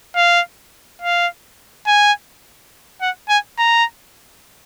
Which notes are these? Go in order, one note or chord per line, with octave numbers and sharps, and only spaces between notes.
F5
F5
G#5
F#5
G#5
A#5